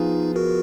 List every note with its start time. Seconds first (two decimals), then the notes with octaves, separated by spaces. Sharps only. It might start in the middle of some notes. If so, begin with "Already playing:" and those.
Already playing: F3 B3 D#4 F4 G#4
0.36 F#4 A#4